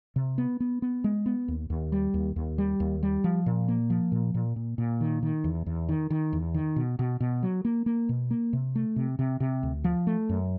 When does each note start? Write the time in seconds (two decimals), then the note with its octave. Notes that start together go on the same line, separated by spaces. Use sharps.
0.16 C3
0.38 B3
0.60 B3
0.82 B3
1.04 G#3
1.26 B3
1.48 D#2
1.70 D#2
1.92 G3
2.14 D#2
2.36 D#2
2.58 G3
2.80 D#2
3.03 G3
3.24 F3
3.46 A#2
3.68 A#3
3.90 F3
4.12 A#2
4.34 A#2
4.56 A#2
4.78 A#2
5.01 D#3
5.23 D#3
5.44 E2
5.66 E2
5.89 D#3
6.10 D#3
6.33 E2
6.54 D#3
6.76 B2
6.99 B2
7.20 B2
7.43 F#3
7.65 A#3
7.86 A#3
8.09 B2
8.31 A#3
8.53 C3
8.75 A3
8.96 C3
9.19 C3
9.40 C3
9.63 D2
9.84 F3
10.07 A3
10.29 F#2